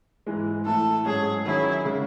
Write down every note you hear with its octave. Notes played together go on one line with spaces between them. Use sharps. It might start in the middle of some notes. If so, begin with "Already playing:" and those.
G#2 E3 G#3
A2 E3 A3 A4
G#2 F#3 C#4 G#4
D#3 F#3 C#4 E4 G#4
C#3 G#3 C#4